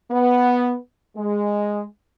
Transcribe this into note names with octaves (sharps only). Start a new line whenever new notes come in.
B3
G#3